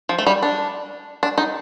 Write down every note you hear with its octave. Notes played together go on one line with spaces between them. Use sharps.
F3
A3
G3
D4
D4
D#4